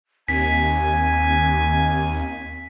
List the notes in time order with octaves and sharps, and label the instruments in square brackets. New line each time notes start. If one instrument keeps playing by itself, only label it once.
[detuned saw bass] D#2 [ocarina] C4 [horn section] G#5 [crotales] B6